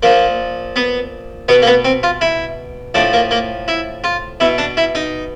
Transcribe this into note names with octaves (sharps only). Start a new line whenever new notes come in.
A#2 F3 A#3
B3
B2 B3
A#3
B3
C4
F4
E4
A2 F3 D4
A#3
A#3
E4
F4
B2 E4
D4
E4
D#4